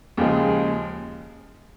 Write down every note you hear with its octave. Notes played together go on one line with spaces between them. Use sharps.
D#2 C#3 F3 G#3